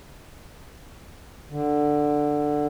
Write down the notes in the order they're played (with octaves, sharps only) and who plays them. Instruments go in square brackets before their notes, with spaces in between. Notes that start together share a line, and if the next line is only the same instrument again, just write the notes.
[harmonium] D3